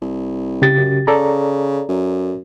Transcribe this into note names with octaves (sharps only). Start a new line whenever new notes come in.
C2
C#3 G4 A6
F#2
C#3 A4 D5 A#5
F#2